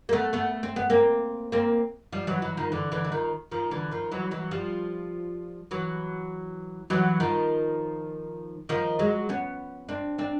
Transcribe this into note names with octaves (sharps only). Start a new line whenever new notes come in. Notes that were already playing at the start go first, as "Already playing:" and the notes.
A#3
A3 B3
A3 B3
C4
B3
A#3 C4
A#3 C4
F3 G3
E3 F#3
E3 F#3
D#3 F3
D3 E3
D3 E3
E3
D#3 F3
D#3 F3
D3 E3
D#3 F3
E3 F#3
E3 F#3
F3 G3
E3 F#3
E3 F#3
D#3 F3
D#3 F3
F#3 G#3
B3 C#4
C4 D4
C4 D4